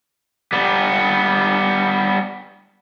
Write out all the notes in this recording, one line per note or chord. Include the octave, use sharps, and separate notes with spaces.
G3 B3